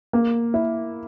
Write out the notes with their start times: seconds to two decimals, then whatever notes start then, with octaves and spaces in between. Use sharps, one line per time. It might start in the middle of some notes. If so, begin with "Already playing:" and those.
0.13 A#3
0.54 E4